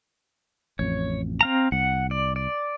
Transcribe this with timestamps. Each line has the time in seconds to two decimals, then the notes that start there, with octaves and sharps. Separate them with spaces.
0.79 A1 F2 C#5
1.41 C4 F5 A#5
1.72 C2 F#5
2.11 D5
2.36 D5